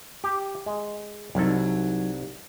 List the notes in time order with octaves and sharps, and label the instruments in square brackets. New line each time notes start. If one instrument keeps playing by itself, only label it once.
[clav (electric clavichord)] G4
G#3
[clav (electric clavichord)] C2 A4 [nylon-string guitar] F#3 D#4